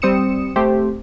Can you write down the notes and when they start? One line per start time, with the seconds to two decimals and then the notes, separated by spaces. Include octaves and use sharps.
0.02 G3 C4 D#6 C#7 E7
0.56 A3 C4 G4 C5